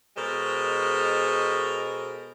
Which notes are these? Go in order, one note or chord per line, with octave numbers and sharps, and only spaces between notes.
B2 G#3 A4 A#4 C5